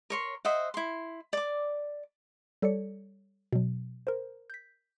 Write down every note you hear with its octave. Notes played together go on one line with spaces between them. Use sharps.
A#4 C#5 C6
C5 D#5 E5 F#5
E4 C6
D5 D6
G3 A4 C#5 D5 C#7
B2 F#3
A#4 C5
G6 B6